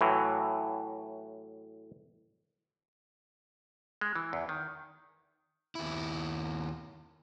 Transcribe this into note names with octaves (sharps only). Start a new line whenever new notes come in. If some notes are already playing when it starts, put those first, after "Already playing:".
A2 E3 F#3
G#3
E3
E2
D#3
D#2 E4